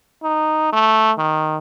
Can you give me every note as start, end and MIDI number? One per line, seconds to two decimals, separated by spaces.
0.23 0.70 63
0.73 1.12 57
1.18 1.57 51